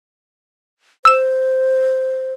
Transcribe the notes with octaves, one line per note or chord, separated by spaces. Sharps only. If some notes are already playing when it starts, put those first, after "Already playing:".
C5 E6 E7